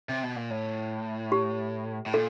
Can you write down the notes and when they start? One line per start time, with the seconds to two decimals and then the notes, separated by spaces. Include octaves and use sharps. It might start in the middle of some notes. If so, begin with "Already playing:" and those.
0.09 C3
0.23 B2
0.36 A#2
0.50 A2
1.32 G4
2.06 A2
2.14 A#2 A4